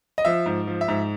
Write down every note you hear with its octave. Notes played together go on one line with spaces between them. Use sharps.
D#5
F3 E5
G#2
F3
E5
G#2